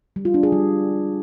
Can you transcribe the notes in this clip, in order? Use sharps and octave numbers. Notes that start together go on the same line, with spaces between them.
G3
F4
D4
G#4
G3